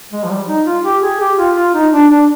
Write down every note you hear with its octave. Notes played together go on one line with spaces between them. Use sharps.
G#3
F3
G3
D#4
F4
G4
G#4
G4
F4
F4
D#4
D4
D4